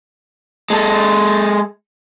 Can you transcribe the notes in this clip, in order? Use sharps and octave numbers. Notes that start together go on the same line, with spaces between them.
G#3 A4